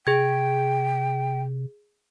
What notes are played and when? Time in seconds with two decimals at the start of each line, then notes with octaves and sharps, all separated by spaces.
0.07 C3 G#4 G5 G#6